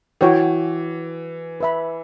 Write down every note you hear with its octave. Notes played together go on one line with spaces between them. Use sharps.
E3 F#4 C#5 G5
B4 E5 B5